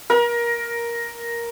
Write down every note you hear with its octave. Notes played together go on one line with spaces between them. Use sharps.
A#4